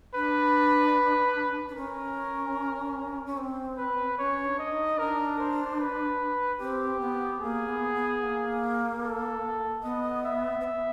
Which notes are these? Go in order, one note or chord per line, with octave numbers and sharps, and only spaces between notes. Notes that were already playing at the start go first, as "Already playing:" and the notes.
D4 B4
D4
C#4 A#4
C#4
C4
B4
C#4 C#5
D4
D#5
D#4
D4 A#4
C5
B4
C4 G4
B3
A#3 G#4
B3
B3
A#3
A4
B3 D#5
E5
C4
B3